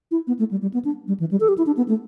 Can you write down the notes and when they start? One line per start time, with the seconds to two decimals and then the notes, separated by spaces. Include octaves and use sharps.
0.11 E4
0.27 B3
0.39 A3
0.51 G3
0.62 G3
0.74 B3
0.85 D4
1.08 G3
1.20 E3
1.31 G3
1.40 A4
1.49 G4
1.58 E4
1.66 D4
1.77 B3
1.88 A3